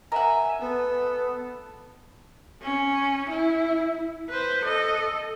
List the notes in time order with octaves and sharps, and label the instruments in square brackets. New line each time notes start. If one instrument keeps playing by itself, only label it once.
[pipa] A#4 F#5 [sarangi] E5 [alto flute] G#5
[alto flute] B3 [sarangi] A4
[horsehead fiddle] C#4
E4
B4 C5
A4 D#5